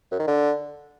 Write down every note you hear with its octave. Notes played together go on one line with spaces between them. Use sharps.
F#2
D#3
D3